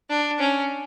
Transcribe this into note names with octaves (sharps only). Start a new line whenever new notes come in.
D4
C#4